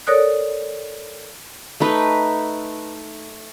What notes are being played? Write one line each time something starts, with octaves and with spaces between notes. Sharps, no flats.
A4 A#4 C#5 D5 D#6 F#6
A3 D#4 B4